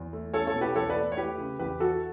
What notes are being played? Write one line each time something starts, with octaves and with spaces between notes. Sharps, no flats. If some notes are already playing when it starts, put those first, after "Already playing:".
Already playing: E2
A3
C#4 A4 C#5
A4 C#5
B2
G4 B4
E2 A4 C#5
B4 D5
A3
C#5
A3 G4 B4
C#3
E2 G4 B4
E3 F#4 A4